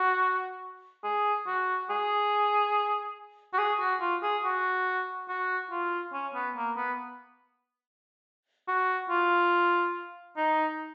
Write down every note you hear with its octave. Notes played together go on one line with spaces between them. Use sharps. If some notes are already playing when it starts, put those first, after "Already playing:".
Already playing: F#4
G#4
F#4
G#4
F#4
G#4
F#4
F4
G#4
F#4
F#4
F4
C#4
B3
A#3
B3
F#4
F4
D#4